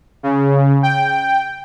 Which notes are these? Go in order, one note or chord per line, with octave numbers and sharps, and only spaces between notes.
C#3
G5